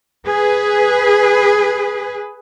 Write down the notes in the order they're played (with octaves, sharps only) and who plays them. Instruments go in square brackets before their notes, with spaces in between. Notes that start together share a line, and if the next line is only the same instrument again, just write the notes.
[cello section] G#4 B4